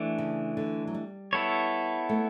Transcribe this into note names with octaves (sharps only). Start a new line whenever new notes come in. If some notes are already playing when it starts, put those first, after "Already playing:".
Already playing: E3 A3 D4
C#3
D3
F#3
G3
B3 E4 A4 C#5
A3